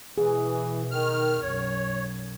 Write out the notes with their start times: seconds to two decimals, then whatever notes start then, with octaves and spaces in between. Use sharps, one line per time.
0.18 B2 E3 G#4
0.91 D#3 F6
1.42 B1 F#2 C#5